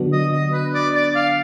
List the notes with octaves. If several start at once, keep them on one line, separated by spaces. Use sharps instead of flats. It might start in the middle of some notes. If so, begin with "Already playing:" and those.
Already playing: D3 F#3 B3 D4 F#4
D#5
D#5
B4
D5
D5
F5